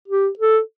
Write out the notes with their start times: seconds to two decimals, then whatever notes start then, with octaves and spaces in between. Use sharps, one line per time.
0.08 G4
0.39 A4